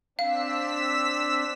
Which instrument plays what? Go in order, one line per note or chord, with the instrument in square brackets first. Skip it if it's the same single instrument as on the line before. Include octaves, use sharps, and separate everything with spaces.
[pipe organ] C4 D4 [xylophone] F5 [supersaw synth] E6 B6